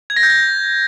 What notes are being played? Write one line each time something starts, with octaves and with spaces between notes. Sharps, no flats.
G#6
A#6
G6
A#6